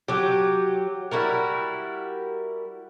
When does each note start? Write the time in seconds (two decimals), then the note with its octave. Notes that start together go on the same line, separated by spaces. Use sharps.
0.08 F#3 G4
1.11 G3 E4 F#4 A#4